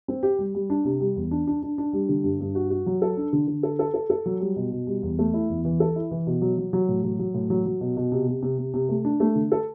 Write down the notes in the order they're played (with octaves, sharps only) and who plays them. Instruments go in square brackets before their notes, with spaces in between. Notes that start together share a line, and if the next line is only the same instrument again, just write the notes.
[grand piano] C4
G4
G3
G3
D4
C3
G3
E2
D4
D4
D4
D4
G3
D3
G2
G2
F#4
F#4
F#3
A4
D4
D3
D3
A4
A4
A4
A4
F#3
G3
B2
B2
G3
E2
A3
E4
E2
E3
A4
E4
E3
B2
F#3
F#3
F#3
A2
F#3
F#3
A2
F#3
F#3
B2
B2
C3
C3
C3
C3
C3
A3
D4
A3
D3
A4